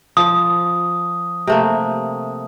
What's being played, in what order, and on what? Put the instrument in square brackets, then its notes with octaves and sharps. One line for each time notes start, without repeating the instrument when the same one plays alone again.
[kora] F3 [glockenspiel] D#6
[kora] C3 A3 A#3